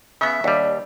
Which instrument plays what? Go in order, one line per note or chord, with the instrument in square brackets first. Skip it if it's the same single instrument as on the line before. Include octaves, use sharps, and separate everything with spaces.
[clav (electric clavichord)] C#3 B3 [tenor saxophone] E5
[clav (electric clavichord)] D#2 G3 [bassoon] D4